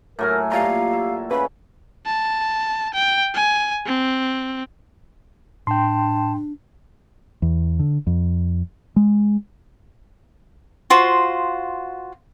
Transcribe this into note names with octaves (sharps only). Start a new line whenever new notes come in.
A2 F#3 A#4 G#5
A#2 G4 F5 A#5
E5
C#3 B4 B5
A5
G5
G#5
C4
A2 D4 G5 A5 C6
E2
D3
F2
G#3
F4 F#4 C5